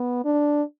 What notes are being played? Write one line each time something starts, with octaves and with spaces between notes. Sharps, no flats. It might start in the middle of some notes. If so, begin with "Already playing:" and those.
Already playing: B3
D4